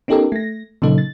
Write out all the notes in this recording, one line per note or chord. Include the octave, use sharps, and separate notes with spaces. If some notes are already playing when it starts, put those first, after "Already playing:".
B3 C#4 D#4 G4 A4 A#4
A3 A#6
A#2 C#3 F#3 D#4 A4
A6